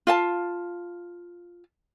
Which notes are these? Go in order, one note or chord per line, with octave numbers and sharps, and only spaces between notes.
F4 F5 A5